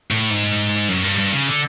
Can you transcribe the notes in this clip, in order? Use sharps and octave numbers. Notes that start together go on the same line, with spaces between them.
A2
G#2
F#2
G2
G2
C#3
D3